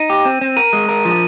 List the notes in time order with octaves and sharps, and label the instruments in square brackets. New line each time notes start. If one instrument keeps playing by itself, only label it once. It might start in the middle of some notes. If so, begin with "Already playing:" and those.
Already playing: [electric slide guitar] D#4 [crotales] D#7
[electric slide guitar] G4
C4
C4
[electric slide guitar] A#4 [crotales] D#7
[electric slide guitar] G#3
A#4
F3